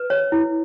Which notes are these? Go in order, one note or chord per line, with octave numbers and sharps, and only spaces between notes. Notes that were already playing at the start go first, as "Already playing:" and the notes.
Already playing: B4
C#5
E4